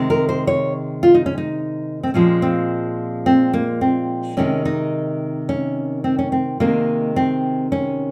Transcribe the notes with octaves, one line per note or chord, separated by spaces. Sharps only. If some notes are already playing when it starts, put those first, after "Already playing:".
Already playing: C3 D#3 G#3
A#4
C5
C#5
F4
D#4
C#4
D#4
C4
A#2 F3 G#3 C#4
C4
C4
A#3
C4
C3 D#3 G#3 C#4
D#4
C#4
C4
C#4
C4
C3 D#3 G#3 A#3
C4
C#4